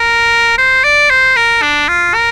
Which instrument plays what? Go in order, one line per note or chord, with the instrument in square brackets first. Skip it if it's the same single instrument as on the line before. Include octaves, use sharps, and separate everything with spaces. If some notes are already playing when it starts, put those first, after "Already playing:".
Already playing: [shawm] A#4
C5
D5
C5
A#4
D4
F4
A#4